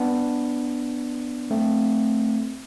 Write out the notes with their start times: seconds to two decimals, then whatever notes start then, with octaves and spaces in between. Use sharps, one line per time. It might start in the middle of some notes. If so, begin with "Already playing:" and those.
Already playing: B3 D4
1.51 A3 C4